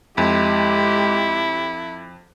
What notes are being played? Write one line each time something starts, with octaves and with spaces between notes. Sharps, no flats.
F2 G#3 E4 G4